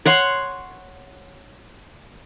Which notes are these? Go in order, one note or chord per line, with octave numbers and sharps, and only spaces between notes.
C#5 F#5 C6